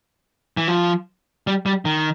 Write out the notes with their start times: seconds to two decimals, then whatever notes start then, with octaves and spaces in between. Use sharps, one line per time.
0.57 E3
0.68 F3
1.47 G3
1.66 G3
1.85 D#3